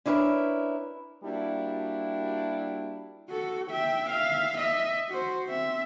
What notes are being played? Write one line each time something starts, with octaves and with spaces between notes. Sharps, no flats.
C#4 D4 E4 G#4 A#4 B4
G3 A#3 D4 E4 F#4
F#4 A4
E5 G5
E5 F5
D#5 E5
F#4 C5
C4 E5